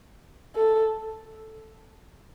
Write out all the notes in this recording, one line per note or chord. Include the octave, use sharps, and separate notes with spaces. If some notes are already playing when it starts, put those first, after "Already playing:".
A4